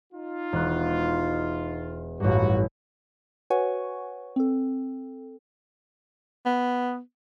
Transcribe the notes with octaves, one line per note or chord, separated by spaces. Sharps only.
D#4 F4
E1 F#6
A1 G2 F#3 F4 F#4
F#4 B4 C#5 F#5 G#5 C#6
C4 A4
B3